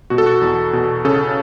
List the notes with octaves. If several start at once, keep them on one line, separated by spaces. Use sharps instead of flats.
B2 F#4
A4
F#4
E2
B2
C#3 A4